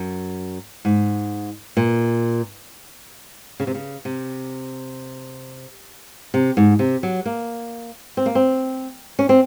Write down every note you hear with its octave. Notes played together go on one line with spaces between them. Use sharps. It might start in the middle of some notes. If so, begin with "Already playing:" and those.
Already playing: F#2
G#2
A#2
C#3
C3
C#3
C3
C3
G#2
C3
F#3
A#3
C4
A#3
C4
C#4
C4